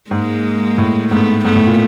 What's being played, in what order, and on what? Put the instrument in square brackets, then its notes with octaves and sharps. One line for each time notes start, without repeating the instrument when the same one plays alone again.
[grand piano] G#2 [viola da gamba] G#3 A#3
[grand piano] A2
[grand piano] G#2 [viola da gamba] A3 B3
[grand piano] G#2 [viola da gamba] A3 B3
[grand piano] A2
A#2